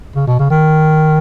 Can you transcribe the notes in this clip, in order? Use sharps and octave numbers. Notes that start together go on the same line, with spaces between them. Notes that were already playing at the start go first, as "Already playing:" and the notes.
C#3
B2
C#3
D#3